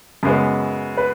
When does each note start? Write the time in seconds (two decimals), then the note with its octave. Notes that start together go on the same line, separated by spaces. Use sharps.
0.23 F#2 C#3 G#3 B3
0.97 B4